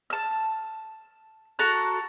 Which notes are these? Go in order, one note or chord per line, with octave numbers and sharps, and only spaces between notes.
A5 F6
F#4 A4 A#5 F#6